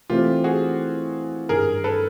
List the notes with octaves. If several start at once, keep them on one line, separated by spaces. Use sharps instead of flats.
E3 A3 C4 F4 G4
F#4 G#4
G2 D#3 G3 G#4 A#4
A4 B4